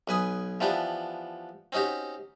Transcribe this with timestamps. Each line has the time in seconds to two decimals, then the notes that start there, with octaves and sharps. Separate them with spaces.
0.08 B1 B4 G#5 D#6
0.60 E3 F3 B3 D4 G4
1.72 C4 C#4 D#4 F#4 G4